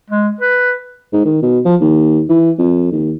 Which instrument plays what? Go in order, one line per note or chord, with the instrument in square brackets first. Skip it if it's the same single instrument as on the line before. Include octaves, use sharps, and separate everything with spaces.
[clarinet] G#3
B4
[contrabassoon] G#2
D#3
B2
F3
D#2
E3
F2
D#2